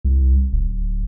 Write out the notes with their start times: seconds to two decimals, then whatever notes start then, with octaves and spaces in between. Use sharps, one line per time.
0.05 C2
0.52 D1